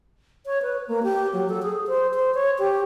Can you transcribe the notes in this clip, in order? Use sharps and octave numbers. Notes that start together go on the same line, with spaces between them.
C#5
B4
A#3
G4
F#3
A4
G#4
C5
C5
C#5
G4